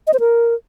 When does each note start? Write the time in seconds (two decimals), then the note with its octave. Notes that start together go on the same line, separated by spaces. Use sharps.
0.07 D#5
0.13 C5
0.20 A#4